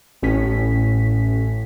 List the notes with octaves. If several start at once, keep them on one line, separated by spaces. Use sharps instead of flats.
A1 A2 C#4 B6